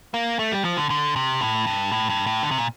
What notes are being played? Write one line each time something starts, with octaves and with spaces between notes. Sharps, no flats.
A#3
A3
G3
F3
D3
D3
C3
A2
G2
A2
G2
A2
D3
C3
A#2